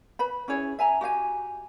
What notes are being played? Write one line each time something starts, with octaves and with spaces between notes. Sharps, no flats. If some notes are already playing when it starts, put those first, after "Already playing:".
B4 B5
C#4 E4 G#4 C#5
E5 G#5 A#5
F#4 G4 F5 G#5